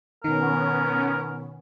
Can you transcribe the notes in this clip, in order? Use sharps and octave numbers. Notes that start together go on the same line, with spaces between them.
B2 D#3 B3 C#4 A#4